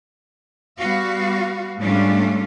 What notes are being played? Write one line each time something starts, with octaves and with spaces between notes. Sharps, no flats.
G3 B3 F#4 F5
G#2 G3 A3 C#4 D4 F4